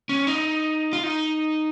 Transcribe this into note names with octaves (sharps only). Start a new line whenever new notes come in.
C#4
D#4
F4
D#4